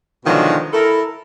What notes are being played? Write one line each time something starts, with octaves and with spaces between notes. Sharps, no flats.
B2 D3 D#3 F3 F#3 G#3
E4 A4 A#4